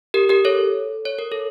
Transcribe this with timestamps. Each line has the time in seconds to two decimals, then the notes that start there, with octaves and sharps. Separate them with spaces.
0.14 G4 A#4
0.29 G4 A#4
0.45 A4 C#5
1.05 C#5
1.19 A#4
1.32 A4